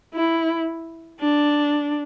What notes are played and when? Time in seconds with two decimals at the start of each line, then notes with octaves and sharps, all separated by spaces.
0.14 E4
1.20 D4